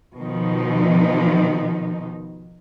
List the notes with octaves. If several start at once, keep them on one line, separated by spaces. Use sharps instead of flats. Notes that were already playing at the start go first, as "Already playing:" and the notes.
B2 D#3 F3 D#4